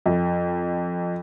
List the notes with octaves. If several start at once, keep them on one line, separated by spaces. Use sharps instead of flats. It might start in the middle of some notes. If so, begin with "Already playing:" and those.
F2